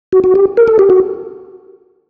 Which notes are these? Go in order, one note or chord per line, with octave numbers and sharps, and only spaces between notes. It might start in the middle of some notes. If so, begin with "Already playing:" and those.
F#4
F#4
G4
A#4
A4
G4
F#4